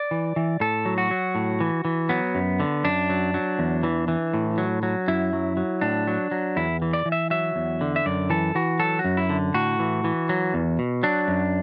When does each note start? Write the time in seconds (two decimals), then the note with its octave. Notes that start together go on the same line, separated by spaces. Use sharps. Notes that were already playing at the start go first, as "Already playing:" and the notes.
Already playing: D5
0.11 E3
0.36 E3
0.60 A2 A4
0.85 F#3
0.98 F#4
1.11 F#3
1.35 A2
1.60 E3
1.85 E3
2.09 F#3 B3
2.35 F#2
2.60 D3
2.84 F#2 D4
3.09 F#3
3.34 F#3
3.59 E2
3.83 E3
4.08 E3
4.34 A2
4.58 F#3
4.83 F#3
5.08 F#2 E4
5.33 F#3
5.57 F#3
5.81 A2 D4
6.07 F#3
6.31 F#3
6.56 E2 E4
6.82 E3
6.93 D5
7.06 E3
7.12 E5
7.30 F#3 E5
7.56 E2
7.81 D3
7.96 E5
8.06 F#2 D5
8.30 E3 A4
8.55 E3 F#4
8.79 F#3 A4
8.99 F#4
9.04 F#2
9.17 E4
9.29 D3
9.54 A2 F#4
9.79 E3
10.04 E3
10.29 F#3
10.54 E2
10.79 B2
11.03 F#3 D4
11.28 F#2